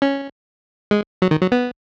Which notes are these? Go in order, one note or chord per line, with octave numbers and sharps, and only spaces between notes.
C#4
G#3
F#3
D#3
F#3
B3